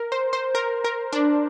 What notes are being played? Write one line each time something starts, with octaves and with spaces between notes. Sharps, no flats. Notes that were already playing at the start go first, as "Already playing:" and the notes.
Already playing: A#4
C5
C5
A#4
A#4
D4